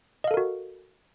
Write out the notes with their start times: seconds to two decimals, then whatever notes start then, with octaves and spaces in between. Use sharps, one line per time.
0.24 D#5
0.27 F5
0.31 A4
0.34 A#4
0.37 F#4